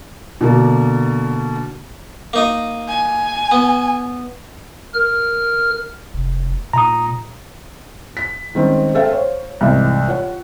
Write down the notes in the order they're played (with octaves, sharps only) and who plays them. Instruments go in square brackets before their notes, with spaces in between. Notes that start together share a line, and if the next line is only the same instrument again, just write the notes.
[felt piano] B2 D3 A#3
[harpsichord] A#3 D#4 D#5
[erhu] G#5
[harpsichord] B3
[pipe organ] A#4 F6
[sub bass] F1
[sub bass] A#2 [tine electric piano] A#5 D#6
[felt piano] B6
D#3 G3 G#3 C4 C#4
G#4 A4 C5 E5 F5 G5
C5 C#5 F5
C2 G#2 E3
F4 C#5 F#5